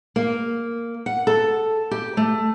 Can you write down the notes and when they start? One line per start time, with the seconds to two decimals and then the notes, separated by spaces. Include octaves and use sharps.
0.16 A#3
1.06 F#5
1.27 A4
1.91 G4
2.17 A3